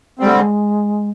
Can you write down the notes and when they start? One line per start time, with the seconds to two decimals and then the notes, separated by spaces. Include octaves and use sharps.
0.19 D3 G3 G#3 C4
0.28 A3
0.36 G#3